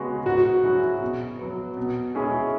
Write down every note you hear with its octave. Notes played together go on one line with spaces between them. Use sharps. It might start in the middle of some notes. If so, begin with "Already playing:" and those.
Already playing: C#3 G#3 B3 F#4
G#2 F#4
F#3 C#4 E4 G#4
B2
F#3 B3
B2
G#3 C#4 E4 G#4